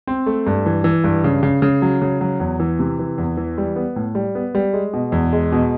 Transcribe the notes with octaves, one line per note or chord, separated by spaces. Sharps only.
C4
A3
G2
E3
E3
G2
C#3
C#3
C#3
F#3
C#3
F#3
E2
E3
C3
E3
E2
E3
G3
B3
A2
G3
B3
G3
G#3
B2
E2
G#3
B2